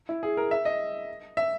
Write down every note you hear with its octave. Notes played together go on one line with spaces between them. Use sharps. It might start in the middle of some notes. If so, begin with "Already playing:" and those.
E4
G#4
A#4
E5
D#5
E5